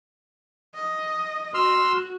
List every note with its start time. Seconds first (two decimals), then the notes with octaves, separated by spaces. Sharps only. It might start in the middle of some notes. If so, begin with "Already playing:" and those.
0.75 D#5
1.54 F#4 C6 E6 F6